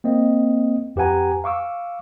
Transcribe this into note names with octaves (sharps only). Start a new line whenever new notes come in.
A#3 C4 D#5
F2 G4 B4 F#5 G#5 A#5
F5 C#6 D6 E6